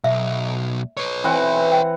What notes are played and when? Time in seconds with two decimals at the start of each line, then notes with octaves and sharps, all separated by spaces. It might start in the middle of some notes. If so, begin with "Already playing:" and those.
0.04 B1 E5
0.97 B4 C#5
1.24 E3 C4 F#5
1.72 G5